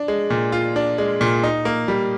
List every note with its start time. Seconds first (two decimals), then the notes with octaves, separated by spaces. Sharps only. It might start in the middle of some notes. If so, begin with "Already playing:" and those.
Already playing: D4
0.08 G#3
0.30 A#2
0.52 F4
0.76 D4
0.98 G#3
1.21 A#2
1.43 D#4
1.65 A#3
1.88 G3